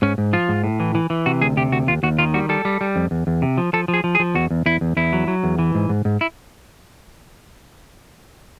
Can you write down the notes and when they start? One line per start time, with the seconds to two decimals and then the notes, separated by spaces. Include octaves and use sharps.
0.02 G#2 C#4
0.18 G#2
0.33 F3 F4
0.49 G#2
0.64 A2
0.80 E3
0.95 E3
1.10 E3
1.26 C3 F#4
1.41 D2 G#4
1.57 C3 G4
1.72 D2 F#4
1.87 D#2 F4
2.03 D#2 F#4
2.19 D#3 F4
2.34 G3 F#4
2.49 G3 A4
2.65 G3
2.81 G3
2.96 F2
3.11 E2
3.27 E2
3.42 C3
3.58 F3
3.73 F3 A4
3.88 F3
3.94 G#4
4.04 F3
4.15 G#4
4.20 F3
4.35 E2 F#4
4.51 E2
4.66 E2 E4
4.81 E2
4.97 E2 E4
5.13 F#3
5.28 F#3
5.44 E2
5.59 E3
5.75 G#2
5.89 G#2
6.05 G#2
6.21 E4